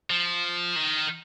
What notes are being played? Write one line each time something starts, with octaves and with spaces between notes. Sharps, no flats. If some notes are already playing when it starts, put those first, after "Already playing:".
F3
D#3